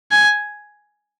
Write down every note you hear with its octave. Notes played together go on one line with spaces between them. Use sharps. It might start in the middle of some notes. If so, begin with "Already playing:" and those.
G#5